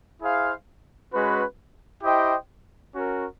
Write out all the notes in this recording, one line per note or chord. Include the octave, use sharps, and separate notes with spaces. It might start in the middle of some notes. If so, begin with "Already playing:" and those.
E4 G#4 C5 F5
G#3 C#4 F#4 B4
E4 G4 C5 D#5 G5
C#4 F#4 A#4